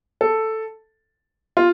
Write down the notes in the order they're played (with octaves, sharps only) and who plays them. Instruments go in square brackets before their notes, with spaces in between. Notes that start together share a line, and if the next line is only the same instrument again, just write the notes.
[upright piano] A4
F4